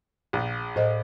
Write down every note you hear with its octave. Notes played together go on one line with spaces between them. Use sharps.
A#1
A2 C5 D#5